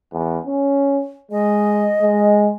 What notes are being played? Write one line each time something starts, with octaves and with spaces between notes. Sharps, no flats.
E2
C#4
G#3 D#5
G#3